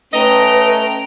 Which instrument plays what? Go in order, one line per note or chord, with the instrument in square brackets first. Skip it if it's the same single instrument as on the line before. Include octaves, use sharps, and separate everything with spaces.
[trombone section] A3 C#4 [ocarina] B4 [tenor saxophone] D#5 [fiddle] G5 A#5